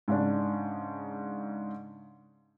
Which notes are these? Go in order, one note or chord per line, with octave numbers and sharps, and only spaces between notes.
G#2 C#3 D4